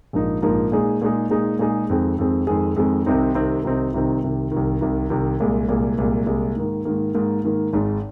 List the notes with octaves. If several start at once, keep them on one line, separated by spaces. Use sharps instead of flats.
A#1 G#2 F3 A#3 D#4
A#1 G#2 F3 A#3 D#4
A#2 G#3 D#4 G#4
A#2 G#3 D#4 G#4
A#2 G#3 D#4 G#4
A#2 G#3 D#4 G#4
F2 D#3 G#3 C4 G#4
F2 D#3 G#3 C4 G#4
F2 D#3 G#3 C4 G#4
F2 D#3 G#3 C4 G#4
C2 C3 D#3 C4 D#4
C2 C3 D#3 C4 D#4
C2 C3 D#3 C4 D#4
C2 C3 D#3 C4 D#4
C2 C3 D#3
C2 C3 D#3
C2 C3 D#3
C2 C3 D#3
C2 A#2 G#3
C2 A#2 G#3
C2 A#2 G#3
C2 A#2 G#3
G#2 D#3 A#3
G#2 D#3 A#3
G#2 D#3 A#3
G#2 D#3 A#3
G#1 G#2 G#3